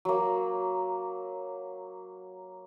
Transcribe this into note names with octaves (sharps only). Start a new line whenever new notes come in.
F#3 A#3